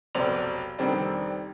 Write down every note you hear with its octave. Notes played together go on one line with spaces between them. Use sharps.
F1 B1 C5 D5 F7
F1 D#3 G3 C4 D4